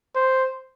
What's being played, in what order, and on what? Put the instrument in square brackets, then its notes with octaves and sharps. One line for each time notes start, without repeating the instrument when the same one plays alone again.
[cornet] C5